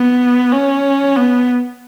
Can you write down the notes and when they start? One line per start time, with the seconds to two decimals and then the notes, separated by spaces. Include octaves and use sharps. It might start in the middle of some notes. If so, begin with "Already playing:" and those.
Already playing: B3
0.52 C#4
1.16 B3